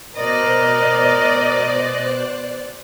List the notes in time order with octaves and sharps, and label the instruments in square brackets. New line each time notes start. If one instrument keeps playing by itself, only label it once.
[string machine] B2 C5 F#6 [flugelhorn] A#4 [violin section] D5 [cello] D#5